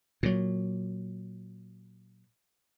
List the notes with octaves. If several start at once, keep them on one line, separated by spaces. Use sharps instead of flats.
A#2 F#3